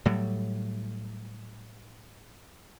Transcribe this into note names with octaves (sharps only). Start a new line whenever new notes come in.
A2 F#3 G3